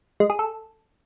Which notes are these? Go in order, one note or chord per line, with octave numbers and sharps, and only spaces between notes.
G#3
G#4
A4